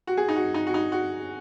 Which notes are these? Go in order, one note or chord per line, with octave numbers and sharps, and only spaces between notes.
F#4
G#4
D#4
F#4
D#4
F#4
D#4
F#4